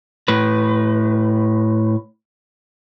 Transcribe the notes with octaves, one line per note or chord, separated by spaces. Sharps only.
A2 B4